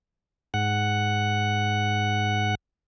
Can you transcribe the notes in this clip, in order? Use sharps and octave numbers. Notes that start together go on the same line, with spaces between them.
G#2 F#5